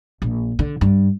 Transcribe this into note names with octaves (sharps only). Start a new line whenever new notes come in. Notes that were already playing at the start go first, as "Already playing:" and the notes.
A#1
D3
G2